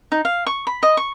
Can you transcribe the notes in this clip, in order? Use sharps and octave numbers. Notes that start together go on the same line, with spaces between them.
D#4
F5
C#6
B5
D#5
C#6